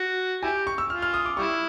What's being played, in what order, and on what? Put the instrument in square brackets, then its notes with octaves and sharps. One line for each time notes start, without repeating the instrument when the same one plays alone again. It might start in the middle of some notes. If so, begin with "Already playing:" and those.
Already playing: [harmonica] F#4
[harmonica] E4 G4 [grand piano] G#5
[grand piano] C#6
E6
[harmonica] F4 [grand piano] F6
[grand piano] F6
D#6
D6
[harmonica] G3 E4 [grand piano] C#6